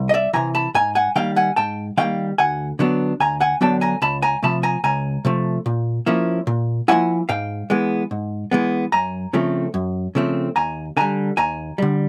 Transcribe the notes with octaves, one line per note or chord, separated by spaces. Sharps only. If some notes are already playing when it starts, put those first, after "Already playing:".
Already playing: C2
D#5
D5 E5
C3 E3 G#5 A#5
A5 B5
G#2 G#5 A#5
F#5 G#5
D#3 G3 A#3 F5 G5
F#5 G#5
G#2 G5 A5
D#3 G3 A#3 F5 G5
D2 F#5 G#5
D3 F#3 B3 D4
D2 G#5 A#5
F#5 G#5
D3 F#3 B3 D4 G5 A5
G#5 A#5
C#2 A5 B5
G#5 A#5
C3 F3 A3 A5 B5
G#5 A#5
C#2 G#5 A#5
C3 F3 A3
A#2
F3 A#3 C#4 E4
A#2
F3 A#3 C#4 E4 F#5 G#5
G#2 F5 G5
E3 G#3 B3
G#2
E3 G#3 B3
F#2 G#5 A#5
C#3 F3 A3 C4
F#2
C#3 F3 A3 C4
D#2 G#5 A#5
D3 G3 G#5 A#5
D#2 G#5 A#5
D3 G3